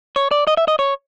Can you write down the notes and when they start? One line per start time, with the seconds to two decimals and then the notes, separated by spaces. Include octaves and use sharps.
0.16 C#5
0.31 D5
0.47 D#5
0.57 E5
0.68 D#5
0.79 C#5